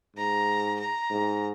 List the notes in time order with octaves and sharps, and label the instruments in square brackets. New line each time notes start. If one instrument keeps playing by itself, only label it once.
[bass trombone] G#2 [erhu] A#5
[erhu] A#5
[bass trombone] G#2